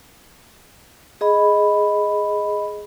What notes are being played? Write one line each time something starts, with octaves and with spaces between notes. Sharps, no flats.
G#4 D#5 B5